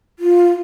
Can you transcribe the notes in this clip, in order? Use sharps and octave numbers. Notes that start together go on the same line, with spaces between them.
F4